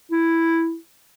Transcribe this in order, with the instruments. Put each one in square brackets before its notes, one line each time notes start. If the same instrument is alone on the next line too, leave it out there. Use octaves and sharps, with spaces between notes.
[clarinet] E4